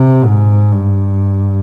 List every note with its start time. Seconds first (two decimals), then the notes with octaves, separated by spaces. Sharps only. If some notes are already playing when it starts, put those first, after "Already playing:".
Already playing: C3
0.25 G#2
0.72 G2